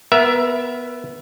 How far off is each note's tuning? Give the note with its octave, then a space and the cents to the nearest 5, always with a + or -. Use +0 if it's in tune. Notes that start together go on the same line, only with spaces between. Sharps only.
B3 +0 A#4 +25 E5 +15